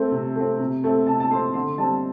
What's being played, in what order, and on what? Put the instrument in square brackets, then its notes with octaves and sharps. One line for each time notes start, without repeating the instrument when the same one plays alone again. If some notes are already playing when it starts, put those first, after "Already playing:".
Already playing: [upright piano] A3 C4 C5
C3
A3 C4
C3
A3 C4
C3 A5
A5
A3 C4 C6
D3 C6
G3 C4 A5